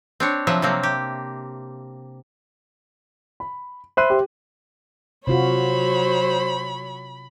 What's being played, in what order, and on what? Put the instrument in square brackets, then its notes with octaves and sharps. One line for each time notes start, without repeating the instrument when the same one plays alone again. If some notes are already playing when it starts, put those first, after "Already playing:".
[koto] C4 D4 C#5
C3 F3 F#3 E5
C3 F#3 A#3 C4
G4
[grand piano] B5
[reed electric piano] C5 E5 C6 [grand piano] B5 F#6 D#7
[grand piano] G4
[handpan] C3 F4 F#4 [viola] F#3 C#5 [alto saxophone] C5 [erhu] B5